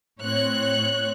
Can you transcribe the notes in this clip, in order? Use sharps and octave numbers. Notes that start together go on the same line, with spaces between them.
A2 C4 C#5 F#6